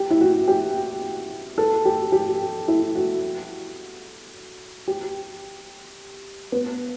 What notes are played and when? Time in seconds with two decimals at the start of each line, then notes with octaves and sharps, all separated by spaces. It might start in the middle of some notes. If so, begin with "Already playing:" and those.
Already playing: G4
0.10 E4
0.21 F#4
0.48 G4
1.58 A4
1.85 G4
2.12 G4
2.68 E4
2.95 F#4
4.88 G4
6.52 B3